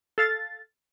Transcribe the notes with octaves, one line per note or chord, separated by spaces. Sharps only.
A4 F5 A6